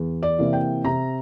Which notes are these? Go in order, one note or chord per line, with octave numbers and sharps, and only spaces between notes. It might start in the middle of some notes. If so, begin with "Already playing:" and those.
Already playing: E2
D5
C3 E3 A#3
G5
C3 A#5